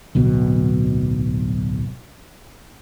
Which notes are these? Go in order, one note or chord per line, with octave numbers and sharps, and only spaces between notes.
D1 B1 B2